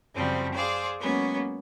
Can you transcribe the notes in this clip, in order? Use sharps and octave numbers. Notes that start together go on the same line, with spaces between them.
F#2 C#3 F3 G3 C4
G#4 C5 D5 F5
F#3 G#3 A#3 B3 C#4